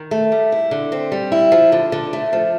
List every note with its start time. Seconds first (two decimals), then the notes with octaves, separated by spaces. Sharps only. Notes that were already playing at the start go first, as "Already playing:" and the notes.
Already playing: D#3
0.11 A3
0.32 G3
0.52 E4
0.71 D3
0.92 C4
1.12 G3
1.32 E4
1.52 F3
1.72 D3
1.92 D3
2.13 A3
2.33 F3